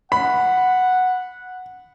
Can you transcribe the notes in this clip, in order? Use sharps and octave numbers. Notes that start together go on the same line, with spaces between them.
F#5 B5